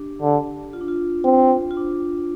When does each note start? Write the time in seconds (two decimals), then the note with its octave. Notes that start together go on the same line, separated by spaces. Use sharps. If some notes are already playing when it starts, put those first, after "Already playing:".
Already playing: D4 G4
0.22 D3
0.73 F4
0.81 D4
0.88 F4
1.25 C4
1.71 F4
1.77 D4